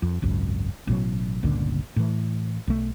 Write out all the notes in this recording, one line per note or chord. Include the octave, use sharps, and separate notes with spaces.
F2
G#1 C#2 F#2
A1 B2 F#3
G1 C#2 A#2 D3
A2 E3
B1 A3